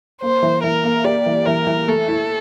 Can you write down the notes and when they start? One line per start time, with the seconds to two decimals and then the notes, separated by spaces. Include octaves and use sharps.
0.22 A#3 C5
0.43 E3
0.64 E3 A#4
0.84 A#3
1.04 G4 D5
1.26 E3
1.46 E3 A#4
1.67 E3
1.88 A3 A4
2.08 E4